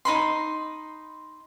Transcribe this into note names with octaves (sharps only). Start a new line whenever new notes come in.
D#4 B5 C6